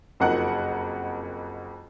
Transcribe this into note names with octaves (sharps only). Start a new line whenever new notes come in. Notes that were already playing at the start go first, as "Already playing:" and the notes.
F#1 F2 D#4 A#4 F#5 F#6